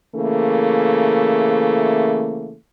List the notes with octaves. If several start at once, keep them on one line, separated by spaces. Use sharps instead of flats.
C#3 E3 A3 A#3